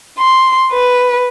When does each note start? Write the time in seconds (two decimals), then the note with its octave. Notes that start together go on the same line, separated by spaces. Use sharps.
0.18 C6
0.72 B4